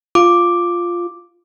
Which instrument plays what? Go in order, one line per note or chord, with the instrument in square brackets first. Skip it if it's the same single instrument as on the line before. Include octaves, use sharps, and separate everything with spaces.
[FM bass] F4 [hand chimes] D6